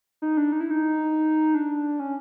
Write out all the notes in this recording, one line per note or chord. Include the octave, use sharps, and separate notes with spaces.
D#4
D4
D#4
E4
D#4
D4
C#4